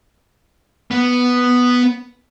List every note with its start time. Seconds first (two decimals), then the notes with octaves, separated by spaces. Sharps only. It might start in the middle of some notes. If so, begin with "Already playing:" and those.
0.91 B3